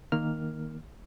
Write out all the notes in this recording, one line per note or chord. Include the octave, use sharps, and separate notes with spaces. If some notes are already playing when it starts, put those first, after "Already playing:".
D#3 A#3 F6